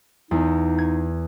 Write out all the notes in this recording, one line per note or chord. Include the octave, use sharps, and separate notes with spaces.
E2 D#4
G#6